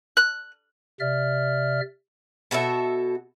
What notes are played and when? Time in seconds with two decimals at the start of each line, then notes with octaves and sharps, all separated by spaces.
0.17 F#6
1.00 C3 D5 E5 F6
2.51 B2 F#4 A4 E5